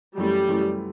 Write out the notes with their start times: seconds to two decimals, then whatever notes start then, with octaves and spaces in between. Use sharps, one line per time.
0.18 F#2 E3 G3 A3
0.48 F#2 E3 A3